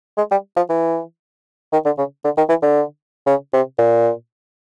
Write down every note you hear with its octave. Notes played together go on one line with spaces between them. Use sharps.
G#3
G3
F3
E3
D#3
D3
C#3
D3
D#3
E3
D3
C#3
C3
A#2